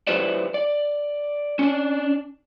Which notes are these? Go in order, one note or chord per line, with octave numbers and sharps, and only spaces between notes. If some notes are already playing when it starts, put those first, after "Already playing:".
F#3 E4 G4 B4 C5 D5
D5
C#4 D4